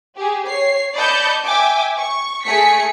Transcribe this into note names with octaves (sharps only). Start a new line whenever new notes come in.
G4 G#4
C#5 C7
D5 D#5 A5 B5 G6 C#7
E5 G5 G#5 D6
C#6
A3 G#4 B6 C#7